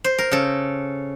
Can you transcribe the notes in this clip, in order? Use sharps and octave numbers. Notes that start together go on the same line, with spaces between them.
C5
A#4
C#3 A4